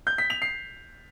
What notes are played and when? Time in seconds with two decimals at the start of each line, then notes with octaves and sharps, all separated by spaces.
0.07 G6
0.18 B6
0.30 F7
0.42 C7